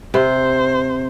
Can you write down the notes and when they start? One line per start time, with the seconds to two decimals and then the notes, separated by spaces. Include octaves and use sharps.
0.14 C3 C5